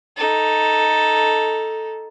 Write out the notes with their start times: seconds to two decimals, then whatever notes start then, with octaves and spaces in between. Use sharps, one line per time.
0.17 D#4 A4